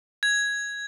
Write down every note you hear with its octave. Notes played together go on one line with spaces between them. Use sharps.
G#6